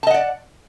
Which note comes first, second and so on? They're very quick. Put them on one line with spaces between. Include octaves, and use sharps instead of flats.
A5 D#5 F#5 D5